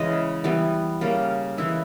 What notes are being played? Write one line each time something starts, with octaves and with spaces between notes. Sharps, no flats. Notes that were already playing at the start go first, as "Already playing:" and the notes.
Already playing: C#3 E3 G#3 D#5
E3 G3 B3
C#3 G3 A#3 C#4
C#3 E3 G#3 E4